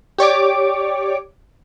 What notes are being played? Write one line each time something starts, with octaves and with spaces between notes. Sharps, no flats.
G4 C#5 D5 D6